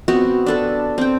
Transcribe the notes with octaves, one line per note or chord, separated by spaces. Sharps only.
B3 C4 F#4
D4 A4 B4
C4 G5